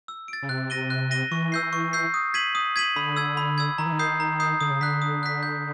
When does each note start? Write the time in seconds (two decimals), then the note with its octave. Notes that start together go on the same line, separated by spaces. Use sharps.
0.08 E6
0.28 A6 D7
0.42 C#3
0.49 C3 F#6
0.70 A#6 D#7 G7
0.90 F#6
1.11 A#6 D#7 G7
1.31 E3 C#6
1.52 E6 G6 C7
1.73 C#6
1.93 E6 G6 C7
2.14 D#6
2.34 G#6 B6 D#7 F#7
2.55 D#6
2.76 G#6 B6 D#7 F#7
2.96 D3 B5
3.16 E6 G#6
3.37 B5
3.58 E6 G#6
3.78 D#3 A#5
3.86 E3
3.92 D#3
3.99 D#6 G6 C7
4.20 A#5
4.40 D#6 G6 C7
4.61 D3 D#6
4.71 C#3
4.81 D3 F#6 B6
5.02 D#6
5.23 F#6 B6
5.43 G6